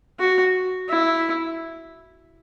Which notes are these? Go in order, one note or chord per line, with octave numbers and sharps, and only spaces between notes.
F#4
E4